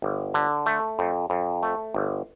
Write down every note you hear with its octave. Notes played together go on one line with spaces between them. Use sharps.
G1
D3
A3
F2
F2
A3
G1